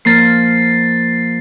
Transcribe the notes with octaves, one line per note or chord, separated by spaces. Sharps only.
F3 A#3 A6 C7